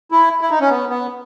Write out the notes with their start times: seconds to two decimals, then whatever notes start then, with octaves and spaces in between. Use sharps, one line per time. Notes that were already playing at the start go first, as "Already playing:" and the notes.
0.12 E4
0.41 E4
0.51 D#4
0.61 C#4
0.70 B3
0.89 B3